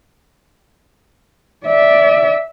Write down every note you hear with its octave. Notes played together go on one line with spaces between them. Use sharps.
D5 E5